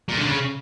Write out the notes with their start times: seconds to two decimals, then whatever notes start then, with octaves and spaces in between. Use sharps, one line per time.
0.08 A#2
0.17 D3
0.26 C#3